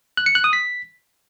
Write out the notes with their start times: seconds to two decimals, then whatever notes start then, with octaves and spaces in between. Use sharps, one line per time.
0.17 F#6
0.26 C#7
0.35 F#6
0.44 D#6
0.53 B6